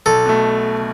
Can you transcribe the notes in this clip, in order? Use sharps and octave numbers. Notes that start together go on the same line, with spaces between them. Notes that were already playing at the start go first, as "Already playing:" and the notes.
B1 A4
B2 A3